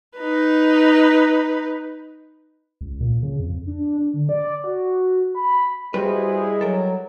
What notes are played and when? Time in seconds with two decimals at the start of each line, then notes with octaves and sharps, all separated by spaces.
0.18 D#4 B4
2.81 C#2
3.01 A#2
3.23 C#3
3.40 F2
3.67 D4
4.14 D3
4.29 D5
4.64 F#4
5.35 B5
5.94 G3 G#3 E4 F#4 G#4 B4 C5
6.61 F#3 A4 A#4